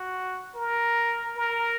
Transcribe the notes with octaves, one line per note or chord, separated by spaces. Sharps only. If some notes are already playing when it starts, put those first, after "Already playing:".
Already playing: F#4
A#4
A#4